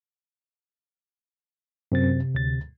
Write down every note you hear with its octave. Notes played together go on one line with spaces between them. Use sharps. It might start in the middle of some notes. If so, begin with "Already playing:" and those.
F#2 C3 C4 A6
D2 A6